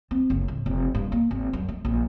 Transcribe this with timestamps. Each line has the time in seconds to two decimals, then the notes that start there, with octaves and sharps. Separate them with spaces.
0.11 C4
0.30 F#1
0.48 A2
0.66 F1
0.95 G2
1.12 A#3
1.31 G#1
1.53 F#2
1.68 A3
1.85 A#1